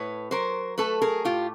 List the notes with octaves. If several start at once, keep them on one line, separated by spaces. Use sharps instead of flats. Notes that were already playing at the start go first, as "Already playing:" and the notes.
Already playing: A2 B4 C#5
F#3 A#4 C5
A3 A4 B4
G#4 A#4
A2 F4 G4